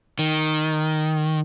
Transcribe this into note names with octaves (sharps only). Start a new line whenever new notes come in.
D#3